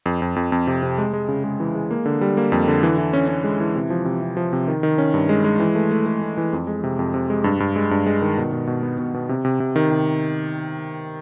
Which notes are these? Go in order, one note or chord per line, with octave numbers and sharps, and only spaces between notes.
F2
F2
F2
F2
C3
C3
G#3
G#3
C#3
G#3
E3
G#3
A#3
D3
G3
A#3
F2
D3
E3
E3
C#4
C#4
G#3
E3
C3
F3
C3
C3
F3
C3
D#3
D#3
C#4
G2
G#3
G#3
E3
A3
A3
A3
A3
E3
F2
G#3
C3
F2
C3
G#3
G2
G2
G#3
G2
G#3
D#3
B2
B2
B2
B3
B2
B2
C3
C3
C3
D#3
C3